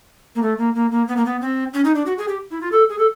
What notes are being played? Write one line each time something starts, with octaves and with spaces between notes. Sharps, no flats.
A#3
A3
A#3
A#3
A#3
B3
A#3
B3
C4
C#4
D#4
D4
F#4
G#4
G4
E4
F4
A4
G#4
A4